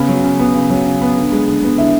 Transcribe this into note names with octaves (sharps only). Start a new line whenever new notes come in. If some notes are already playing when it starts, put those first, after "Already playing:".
Already playing: C#3 B3 B5
F#3
C#3
B3
C#3
F#3
C#3
B3
D3
G#3
D3
B3
D3 E4 E5